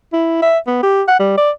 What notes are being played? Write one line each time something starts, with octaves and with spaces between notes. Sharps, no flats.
E4
E5
B3
G4
F#5
G3
D5